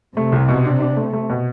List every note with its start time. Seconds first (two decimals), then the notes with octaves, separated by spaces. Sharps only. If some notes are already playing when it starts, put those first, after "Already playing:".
0.16 C3 A3
0.32 C2
0.49 B2
0.65 D4
0.81 D4
0.97 A3
1.13 A3
1.30 B2